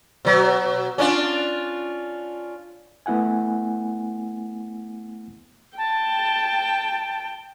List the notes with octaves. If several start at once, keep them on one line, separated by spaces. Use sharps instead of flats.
B2 F#3
C#4 D4 F4
A3 B3 E4 F#5 G#5
G5 A5